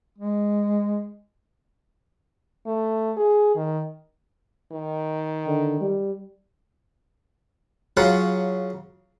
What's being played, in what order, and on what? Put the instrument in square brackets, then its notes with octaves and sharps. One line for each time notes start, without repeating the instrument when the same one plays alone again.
[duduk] G#3
[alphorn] A3
G#4
D#3
D#3
[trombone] D3
G3
[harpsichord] C#3 F#3 F4 F#5